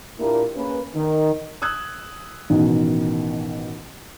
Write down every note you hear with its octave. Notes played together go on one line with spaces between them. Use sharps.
A#2 A#3 D4 E4 G4 A#4
A#3 C#4 G#4 B4
D#3
D#6 E6 F#6 G#6
A1 B2 D#3